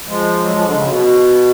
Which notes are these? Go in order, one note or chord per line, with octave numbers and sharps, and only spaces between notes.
F3 G#3
F#3
F3
D3
C#3
B2